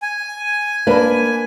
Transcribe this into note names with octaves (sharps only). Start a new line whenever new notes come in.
G#5
A#3 D4 B4 B5